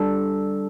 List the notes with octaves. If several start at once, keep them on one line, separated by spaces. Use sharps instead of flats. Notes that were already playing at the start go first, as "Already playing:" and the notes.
Already playing: G3 D4 A4